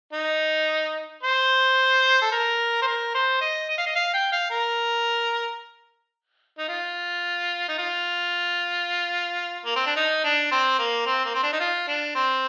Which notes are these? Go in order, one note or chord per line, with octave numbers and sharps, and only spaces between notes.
D#4
C5
A4
A#4
C5
A#4
C5
D#5
D#5
F5
D#5
F5
G5
F5
A#4
D#4
F4
D#4
F4
A#3
C4
D4
D#4
D4
C4
A#3
C4
A#3
C4
D4
D#4
F4
D4
C4